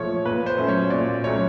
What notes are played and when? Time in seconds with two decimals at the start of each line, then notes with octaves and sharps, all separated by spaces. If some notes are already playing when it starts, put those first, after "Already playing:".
Already playing: A#2 F3 A3 C#5
0.25 A#2 B4
0.46 C5
0.58 F#3 A3 C#4
0.68 C#5
0.90 A#2 D5
1.24 F#3 A3 C#4 C#5